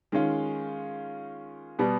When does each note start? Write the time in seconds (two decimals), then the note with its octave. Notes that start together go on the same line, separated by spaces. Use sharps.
0.12 D#3 G#3 C#4 F4
1.79 B2 G3 B3